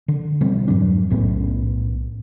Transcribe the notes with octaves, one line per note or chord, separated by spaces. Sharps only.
D3
B2 F3 G3 C4
F2 G#2 F#3 D4
B1 A2 B3 C#4